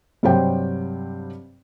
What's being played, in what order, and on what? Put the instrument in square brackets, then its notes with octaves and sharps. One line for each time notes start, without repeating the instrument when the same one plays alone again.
[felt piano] G2 C3 F#3 G3 C5 G5